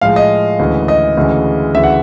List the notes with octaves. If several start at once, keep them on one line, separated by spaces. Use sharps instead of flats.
A2 F3 G#3 F5
D#5
D2 C#3 E3 G#3
D#5
D2 C#3 E3 G#3
D2 C#3 E3 E5
F#5